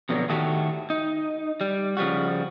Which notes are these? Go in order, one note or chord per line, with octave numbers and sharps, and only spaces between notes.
F2 B2 D3 F#3
A2 D#3 A3 F#4 G4
D#4
G3
C#3 F3 G3 F#4